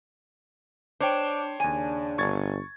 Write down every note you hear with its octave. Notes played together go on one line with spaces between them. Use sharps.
D4 C5 C#5 G5
D#2 C#3 D4 G#5 D#7
G1 C#6 G#6 A6